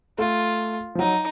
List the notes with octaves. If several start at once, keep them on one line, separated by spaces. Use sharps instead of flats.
A3 F4
F3
F#3 D#4